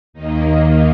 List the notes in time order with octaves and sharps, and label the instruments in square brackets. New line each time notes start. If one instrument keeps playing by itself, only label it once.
[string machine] D#2 D#3 A#3 D#4